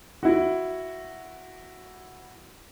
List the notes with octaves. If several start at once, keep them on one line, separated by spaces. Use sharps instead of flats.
E4 F#4